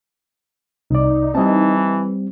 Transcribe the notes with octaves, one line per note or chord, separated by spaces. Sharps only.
C2 D#4 D5
E3 G3 C4 D#5 A5